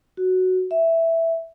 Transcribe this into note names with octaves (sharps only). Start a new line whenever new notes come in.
F#4
E5